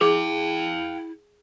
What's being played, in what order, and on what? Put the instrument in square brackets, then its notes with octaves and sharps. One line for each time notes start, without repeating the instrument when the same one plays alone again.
[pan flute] E4 [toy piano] G#4 [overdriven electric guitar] F5 G5